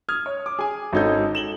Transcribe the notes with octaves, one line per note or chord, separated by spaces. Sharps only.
D#6 F6 G#6
C#5
D6
G#4 G#5
G#1 C#4 D#4 A4 G6
E7 F#7 G7